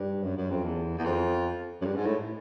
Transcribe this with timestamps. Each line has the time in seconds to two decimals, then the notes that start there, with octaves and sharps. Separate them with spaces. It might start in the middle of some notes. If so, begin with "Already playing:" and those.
Already playing: G2
0.23 F#2
0.37 F#2
0.51 F2
0.64 E2
0.98 E2
1.05 F2
1.82 F#2
1.86 G2
1.96 G#2
2.06 A2